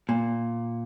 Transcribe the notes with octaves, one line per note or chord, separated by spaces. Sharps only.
A#2